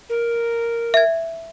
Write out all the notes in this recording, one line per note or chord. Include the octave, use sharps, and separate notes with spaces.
A#4
E5 G#6